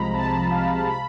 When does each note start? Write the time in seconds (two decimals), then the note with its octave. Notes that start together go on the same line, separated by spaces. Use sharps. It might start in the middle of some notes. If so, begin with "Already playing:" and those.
Already playing: C2 C3 F3 G#3 A#5 B5
0.13 C2 A5
0.51 C3 F3 G#3 F5
0.89 B5